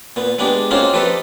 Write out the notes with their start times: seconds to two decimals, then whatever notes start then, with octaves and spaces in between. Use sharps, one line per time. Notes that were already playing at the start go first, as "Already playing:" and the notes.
0.16 A#2 B3
0.39 G#3 B3 D4 G4
0.71 A#3 C4 C#4 D#4 F4 F#4
0.93 F3 D#4 G4 A4 B4